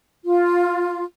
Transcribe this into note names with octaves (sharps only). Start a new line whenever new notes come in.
F4